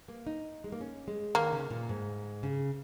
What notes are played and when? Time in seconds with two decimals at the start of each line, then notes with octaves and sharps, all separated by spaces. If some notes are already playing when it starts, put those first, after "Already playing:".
0.08 A#3
0.27 D#4
0.64 G#3
0.72 A#3
0.81 C#4
1.08 G#3
1.35 D#3 A#3
1.52 C#3
1.70 A#2
1.89 G#2
2.43 C#3